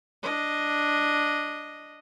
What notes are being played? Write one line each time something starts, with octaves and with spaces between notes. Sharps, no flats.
D4 D#5